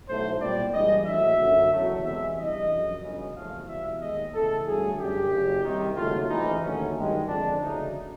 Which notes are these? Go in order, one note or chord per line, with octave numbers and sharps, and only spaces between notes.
B1 A2 F#3 A3 C5
C2 A#2 G3 D5
G2 E3 G#3 D#5
A#1 A2 F#3 E5
F#2 D3 F#3
F#1 E2 B2 F#3 A3
E2 C3 E3 G#3 E5
G2 E3 G3 D#5
F#2 C#3 F3
G1 F#2 C#3
F#1 E2 C3 F3 A3 F5
E2 B2 G3 E5
D#2 D#3 G#3 D#5
E2 C#3 E3 A3 A4
G2 D3 F#3 A3 G#4
F#2 D3 G3 G4
F#1 F#2 C#3
C2 C3 D#3
D#2 C#3 F#3 A3 F4
A1 G#2 E3 D#4
D#2 D3 F#3 A3 C#4
G2 D#3 G#3
F2 D3 F3 G#3 D4
D2 C#3 F#3 A3 D#4